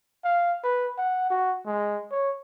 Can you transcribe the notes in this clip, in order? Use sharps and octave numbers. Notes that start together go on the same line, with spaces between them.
F5
B4
F#5
F#4
G#3
C#5